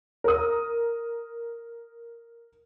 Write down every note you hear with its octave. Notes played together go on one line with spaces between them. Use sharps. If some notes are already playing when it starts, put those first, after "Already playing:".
A#4 D#6